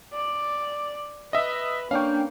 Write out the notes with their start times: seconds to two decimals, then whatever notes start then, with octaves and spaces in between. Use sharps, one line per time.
0.13 D5
1.33 B4 D#5 E5
1.91 A#3 C#4 D4 F5 G5 C#6